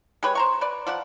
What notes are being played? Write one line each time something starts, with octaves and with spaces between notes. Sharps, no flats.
G#3 G4 B4 C#5
C5 A#5 C#6
B4 D5
F3 D5 F#5